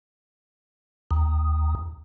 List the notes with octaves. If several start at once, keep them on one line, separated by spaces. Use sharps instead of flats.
D#2